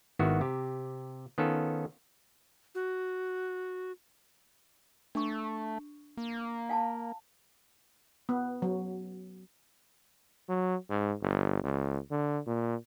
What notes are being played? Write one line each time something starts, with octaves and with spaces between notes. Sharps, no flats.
G#1 D#3 B3 E4 F#4 E5
C3 G4
D#3 B3 C#4 F4 A4
F#4
A3 D4 C#6
A#3
F5 G#5 A5
B3
F#3
F#3
G#2
G1
C#2
D3
A#2